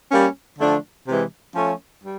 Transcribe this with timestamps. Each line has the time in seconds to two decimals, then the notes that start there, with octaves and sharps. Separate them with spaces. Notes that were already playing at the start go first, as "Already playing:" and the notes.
0.10 G3 A#3 C#4
0.58 D3 F3 A3 D4
1.07 C3 E3 G#3
1.55 F3 A3 C#4
2.03 G3